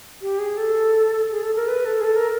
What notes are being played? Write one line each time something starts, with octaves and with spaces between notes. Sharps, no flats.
G4
G#4
A4
G#4
A4
A#4
B4
A4
G#4
A4
A#4